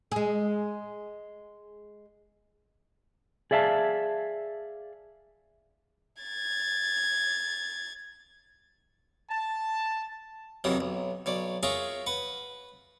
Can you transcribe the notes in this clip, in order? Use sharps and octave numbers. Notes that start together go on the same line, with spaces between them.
G#3 G#4
G#4 D5 E5 F5 A5
G#6 A6
A5
F2 C3 D#3 E3 F#3 D#6
B1
B1 C#5 D5
F4 G#4 A#4 C#5 E5 C#6
B4 F#5 B5